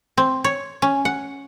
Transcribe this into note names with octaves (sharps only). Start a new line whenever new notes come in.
C4
C#5
C#4
F#5